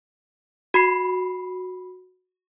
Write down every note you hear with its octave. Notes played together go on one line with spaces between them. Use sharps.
F#4 B5 C7